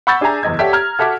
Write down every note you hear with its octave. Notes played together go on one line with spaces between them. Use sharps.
F#5 B5 C#6 E6 G6 A6
D4 G#4 E5 G#5 A#5
F#1 E2 D#5 G#6
G4 A4 C#5 D5 E5 F#5
A#5 F6 G#6
F#4 A4 E5 F#5 D6